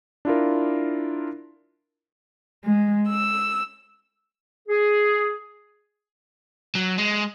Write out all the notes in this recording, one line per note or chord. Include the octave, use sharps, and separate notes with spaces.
D4 E4 F4 A#4
G#3
E6
G#4
F#3
G#3